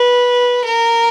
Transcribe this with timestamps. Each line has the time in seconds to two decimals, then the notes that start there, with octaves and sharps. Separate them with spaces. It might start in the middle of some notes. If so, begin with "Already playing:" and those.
Already playing: B4
0.64 A#4